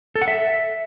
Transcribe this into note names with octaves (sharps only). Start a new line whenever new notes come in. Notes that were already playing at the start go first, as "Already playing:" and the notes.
A4
F#5
E5